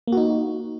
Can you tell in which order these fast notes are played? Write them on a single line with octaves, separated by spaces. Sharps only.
A#3 F#4 D#4